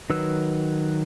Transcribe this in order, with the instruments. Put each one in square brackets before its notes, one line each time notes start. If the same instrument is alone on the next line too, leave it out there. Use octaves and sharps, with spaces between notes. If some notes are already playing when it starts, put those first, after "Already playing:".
[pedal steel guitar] D#3 F#3 B4 E6